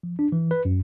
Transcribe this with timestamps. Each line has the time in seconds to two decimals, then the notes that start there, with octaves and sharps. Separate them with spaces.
0.03 F3
0.19 D4
0.32 E3
0.51 B4
0.65 F#2